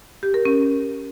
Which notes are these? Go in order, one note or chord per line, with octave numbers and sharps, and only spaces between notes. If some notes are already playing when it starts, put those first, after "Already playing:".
G4
A#4
C#4